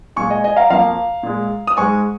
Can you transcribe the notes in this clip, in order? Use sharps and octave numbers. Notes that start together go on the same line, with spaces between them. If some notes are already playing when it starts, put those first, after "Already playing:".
A#2 G#3 G#5 C#6
D#5 G#5
D#5 G#5
F5 A#5
F2 F3 A#3 F5 A#5
A#2 G#3
D#6
G#2 G#3 G#5 C#6